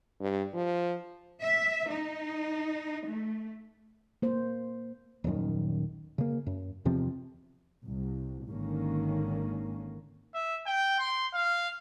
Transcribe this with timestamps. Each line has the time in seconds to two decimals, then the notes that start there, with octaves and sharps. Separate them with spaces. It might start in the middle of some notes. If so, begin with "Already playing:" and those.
0.20 G2
0.54 F3
1.43 E5
1.92 D#4
3.06 A3
4.22 A#3 C5
5.24 D#1 A#1 F#2 D#3
6.18 C#3 A#3
6.47 F#2
6.85 E2 C3 F3 C4
7.84 C2
8.49 G#1 D3 D#3 A#3 C#4
10.34 E5
10.66 G5
10.99 C6
11.33 F5